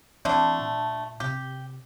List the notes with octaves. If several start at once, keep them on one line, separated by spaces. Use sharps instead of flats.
D3 E3 A3 C4 D4
A#2
C3 G4